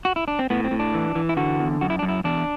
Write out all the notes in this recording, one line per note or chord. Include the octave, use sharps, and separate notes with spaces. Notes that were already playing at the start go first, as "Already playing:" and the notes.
F#4
E4
D4
C4
A2 B3
C4
A2
D4
E3
E3
E4
D3 F#4
E2
F#2 F#4
E4
F#2 D4
E4
E2 D4